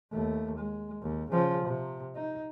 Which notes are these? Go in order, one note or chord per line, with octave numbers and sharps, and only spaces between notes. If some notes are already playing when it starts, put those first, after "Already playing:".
D#2 A3
G#3
D#2
C#3 F3
C3
D#4